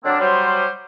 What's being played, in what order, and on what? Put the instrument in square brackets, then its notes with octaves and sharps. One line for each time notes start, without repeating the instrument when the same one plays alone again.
[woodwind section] D3 F#3 A#3 C4 D4
F#3 G3 C5